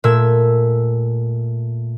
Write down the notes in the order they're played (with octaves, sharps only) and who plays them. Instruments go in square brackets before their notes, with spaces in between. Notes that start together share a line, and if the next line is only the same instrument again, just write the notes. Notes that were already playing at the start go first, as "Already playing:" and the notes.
[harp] A#2 A3 E6 G#6